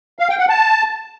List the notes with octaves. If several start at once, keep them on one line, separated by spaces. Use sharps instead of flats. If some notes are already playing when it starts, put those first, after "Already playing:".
F5
G5
F#5
A5